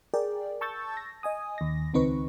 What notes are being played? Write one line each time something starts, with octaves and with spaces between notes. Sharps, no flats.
G#4 A#4 D5 G5
A5 C#6 E6 G6 A6
A#6
D#5 G#5 D#6
D#2 A#6
C#2 D#3 C4 D#4 B4 C#6